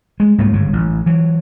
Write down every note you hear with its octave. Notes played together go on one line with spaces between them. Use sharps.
G#3
C2 G#2 A3 A#3
G1 G#2 C#3
A1
E3 F#3